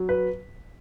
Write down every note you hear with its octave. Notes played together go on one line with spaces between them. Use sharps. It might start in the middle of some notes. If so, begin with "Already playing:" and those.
Already playing: F#3
B4